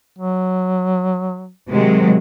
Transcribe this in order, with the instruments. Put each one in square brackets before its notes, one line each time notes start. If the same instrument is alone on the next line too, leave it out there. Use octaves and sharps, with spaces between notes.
[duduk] F#3
[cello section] C3 F#3 G#3 [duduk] D#3